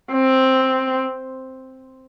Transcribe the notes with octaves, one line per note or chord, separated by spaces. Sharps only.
C4